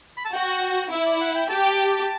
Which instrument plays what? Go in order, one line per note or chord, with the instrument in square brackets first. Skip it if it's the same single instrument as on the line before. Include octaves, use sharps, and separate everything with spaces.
[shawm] B5
A5
[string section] F#4 [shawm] G5
[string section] E4 [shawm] E5
[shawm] D5
F#5
G5
[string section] G4 [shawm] A5